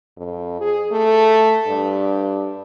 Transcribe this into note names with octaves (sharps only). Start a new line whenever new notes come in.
F2
G#4
A3
G2